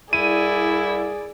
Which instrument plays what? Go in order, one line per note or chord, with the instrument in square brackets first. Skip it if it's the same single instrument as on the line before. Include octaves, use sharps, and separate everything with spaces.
[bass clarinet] C2 [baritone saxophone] E4 [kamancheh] G#4 D5 [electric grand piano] D#7